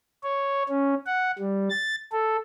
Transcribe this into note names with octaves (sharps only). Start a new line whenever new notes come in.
C#5
C#4
F#5
G3
A6
A4